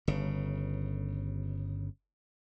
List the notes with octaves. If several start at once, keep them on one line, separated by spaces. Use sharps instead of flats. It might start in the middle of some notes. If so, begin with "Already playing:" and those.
G1 C#3